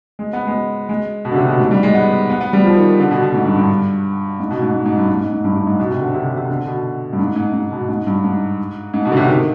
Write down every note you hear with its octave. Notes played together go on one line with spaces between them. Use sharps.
G#3
B3
G#3
G#3
B2
D3
C3
B2
G#2
G3
G#3
B3
B3
B3
G3
F3
D#3
D3
B2
B2
G#2
G2
G2
G#2
B2
G#2
G#2
G#2
G2
G#2
G#2
G#2
G2
G2
G#2
B2
C3
D3
C3
B2
C3
D3
B2
G2
G#2
G#2
G#2
B2
G#2
G2
G#2
G#2
B2
D3
C3
D#3